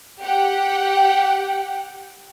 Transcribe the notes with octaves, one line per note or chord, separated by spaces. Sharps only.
G4 F#5 G5